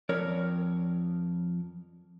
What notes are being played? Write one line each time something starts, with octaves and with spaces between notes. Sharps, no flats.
F2 A#4 C#5 D5